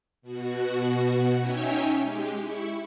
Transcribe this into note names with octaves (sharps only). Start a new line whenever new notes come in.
B2 F#4
C#4 D#4 C#5 E5 G5 G#5
G#3 G4
E4 C#6